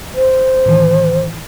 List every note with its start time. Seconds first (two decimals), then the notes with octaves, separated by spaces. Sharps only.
0.15 C5
0.66 A2 D#3 E3